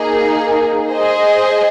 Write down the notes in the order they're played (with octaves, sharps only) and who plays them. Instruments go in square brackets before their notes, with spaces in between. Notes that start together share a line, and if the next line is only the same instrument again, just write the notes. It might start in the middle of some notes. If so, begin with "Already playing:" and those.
Already playing: [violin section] A#3 D#4 G#4
G#4 C5 D#5